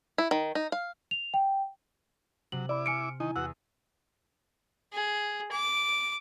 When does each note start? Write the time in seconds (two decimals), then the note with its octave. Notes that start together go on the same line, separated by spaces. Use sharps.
0.18 E4
0.31 D#3
0.55 D#4
0.72 F5
1.11 F7
1.34 G5
2.52 C3 F#3 F#7
2.69 E4 D5 B5 D6
2.86 G#5 C6 F6 C#7 D7
3.20 D#3 D#4 E4 G#5
3.36 E2 F#4 F#5 E6
4.93 G#4
5.51 D6